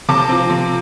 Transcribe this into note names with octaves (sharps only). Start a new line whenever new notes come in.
C3 A5 D6
F3 C4
C3